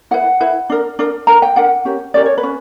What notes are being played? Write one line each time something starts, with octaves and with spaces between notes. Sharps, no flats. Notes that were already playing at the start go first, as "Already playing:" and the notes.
E4 B4 F#5
E4 B4
D4 A#4
D4 A#4
D4 A#4 A#5
G5
D4 A#4 F#5
C#4 G4 A#4
C#4 G4 A#4 D5
C#5
B4
C#4